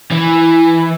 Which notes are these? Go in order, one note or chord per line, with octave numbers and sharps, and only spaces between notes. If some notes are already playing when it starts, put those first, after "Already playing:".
E3